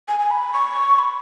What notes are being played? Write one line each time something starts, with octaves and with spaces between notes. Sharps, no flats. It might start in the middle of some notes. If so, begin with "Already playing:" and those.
G#5
G#5
B5
C#6
B5